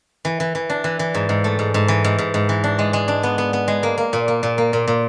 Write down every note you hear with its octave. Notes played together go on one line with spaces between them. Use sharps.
E3
E3
E3
D4
E3
E3
G#2
G#2
A3
G#2
G#2
E3
G#2
G#2
G#2
E3
D4
G#3
G#3
D4
B3
B3
B3
G#3
A#3
A#3
A#2
A#3
A#2
A#3
A#2
A#2